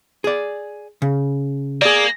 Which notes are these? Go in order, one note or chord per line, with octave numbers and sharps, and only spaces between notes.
G#4 D5
C#3
A#3 G#4 D5